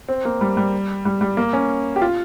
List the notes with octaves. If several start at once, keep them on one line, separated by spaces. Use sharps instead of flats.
C4
A#3
G3
G3
G3
G3
A#3
C#4
G4
F4